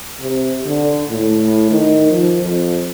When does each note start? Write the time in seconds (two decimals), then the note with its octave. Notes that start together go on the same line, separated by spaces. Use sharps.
0.20 C3
0.65 D3
1.10 A2
1.71 D#3
2.09 F3
2.42 F2